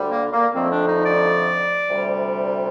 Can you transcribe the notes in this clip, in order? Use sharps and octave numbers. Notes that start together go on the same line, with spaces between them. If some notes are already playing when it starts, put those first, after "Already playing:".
Already playing: D2 D3 G3
A#3
A#3
F2 D3 F3 A3 C4
D4
D#4
D5
D2 C3 G3